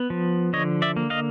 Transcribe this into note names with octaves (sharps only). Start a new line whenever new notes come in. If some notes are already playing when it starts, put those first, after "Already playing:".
Already playing: B3
F3
D3 C#5 D#5
D5 E5
A#3
D#5 F5